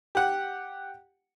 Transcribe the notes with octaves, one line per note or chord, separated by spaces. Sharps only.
G4 F#5